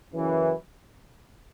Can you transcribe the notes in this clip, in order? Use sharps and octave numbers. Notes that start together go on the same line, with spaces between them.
F#2 C#3 E3